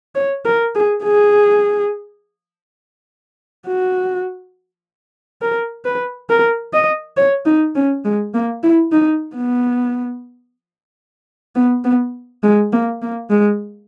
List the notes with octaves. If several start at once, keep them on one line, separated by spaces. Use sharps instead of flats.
C#5
A#4
G#4
G#4
F#4
A#4
B4
A#4
D#5
C#5
D#4
C#4
G#3
A#3
E4
D#4
B3
B3
B3
G#3
A#3
A#3
G#3